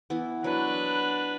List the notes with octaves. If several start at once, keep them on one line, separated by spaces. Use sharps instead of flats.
E3 B3 E4
F#3 D4 B4